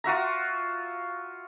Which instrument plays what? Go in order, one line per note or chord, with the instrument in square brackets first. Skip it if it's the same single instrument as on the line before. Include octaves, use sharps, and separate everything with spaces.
[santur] F4 F#4 E5 A#5